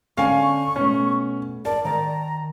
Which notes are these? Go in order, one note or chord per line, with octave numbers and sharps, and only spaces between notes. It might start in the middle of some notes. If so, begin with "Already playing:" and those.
D3 C#4 D4 F5 G#5 C#6
B2 A3 C#4
A#4 D5 A5
D#3 D5 A#5